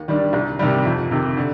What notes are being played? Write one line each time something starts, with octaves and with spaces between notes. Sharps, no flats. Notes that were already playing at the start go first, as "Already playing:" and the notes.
Already playing: D#2
D#3 G3 D4
C2
C3 D#3 G3
F2
C3 D#3
D3